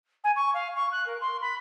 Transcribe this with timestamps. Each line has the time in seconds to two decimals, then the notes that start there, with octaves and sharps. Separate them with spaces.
0.24 G#5
0.36 C#6
0.54 F5
0.76 C#6
0.92 F#6
1.06 A#4
1.21 C6
1.41 B5